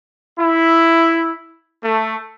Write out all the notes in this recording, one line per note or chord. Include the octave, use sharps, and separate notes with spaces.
E4
A3